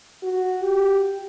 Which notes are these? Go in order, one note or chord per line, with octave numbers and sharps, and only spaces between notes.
F#4
G4